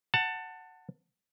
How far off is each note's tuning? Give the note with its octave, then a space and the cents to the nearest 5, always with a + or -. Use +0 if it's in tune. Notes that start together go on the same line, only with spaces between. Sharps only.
F#5 +0 A5 +20